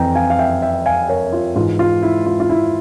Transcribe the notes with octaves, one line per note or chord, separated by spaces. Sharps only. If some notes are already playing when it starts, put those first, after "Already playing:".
Already playing: F2 E3 G5 A#5
F5 G#5
F5
E5 G5
E5 G5
F5 G#5
A#4 C#5
F4
G#2 E3 F4
F4
E4
F4
F4
E4